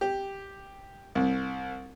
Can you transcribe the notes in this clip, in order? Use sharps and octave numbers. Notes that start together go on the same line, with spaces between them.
G4
C2